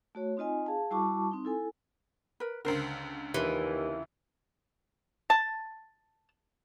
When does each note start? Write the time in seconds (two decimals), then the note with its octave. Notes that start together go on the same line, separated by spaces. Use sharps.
0.15 A3 F#4 C#5
0.37 C4 D#4 F4 D#5 G#5
0.66 G#4 F5 A5
0.91 G3 E4 F#4 A5 C#6 D6
1.31 C4 D#4
1.45 E4 A4 G#5
2.40 A#4 B4
2.65 C#2 D3 A#4 C5
3.34 D#2 E3 F4
5.30 A5